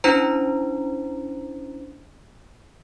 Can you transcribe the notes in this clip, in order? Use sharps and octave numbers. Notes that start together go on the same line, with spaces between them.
C#4 D4 E4 C5 A#5